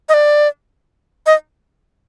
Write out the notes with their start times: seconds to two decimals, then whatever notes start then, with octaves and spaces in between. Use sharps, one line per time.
0.09 D#5
0.14 D5
1.26 D#5